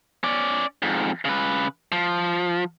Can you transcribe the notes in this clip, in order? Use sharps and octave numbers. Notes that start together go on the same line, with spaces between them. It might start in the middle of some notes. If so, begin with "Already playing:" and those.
C#4 D5
F2 G#2
C#3 B4
F3